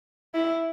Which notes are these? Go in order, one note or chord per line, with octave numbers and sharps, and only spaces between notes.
E4